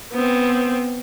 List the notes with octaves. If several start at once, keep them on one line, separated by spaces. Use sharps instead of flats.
B3 C4